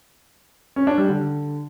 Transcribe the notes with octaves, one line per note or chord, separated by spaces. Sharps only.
C#4
D4
G3
D3